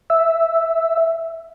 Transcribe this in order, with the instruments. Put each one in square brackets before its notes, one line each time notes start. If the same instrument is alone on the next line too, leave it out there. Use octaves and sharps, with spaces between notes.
[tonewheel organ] E5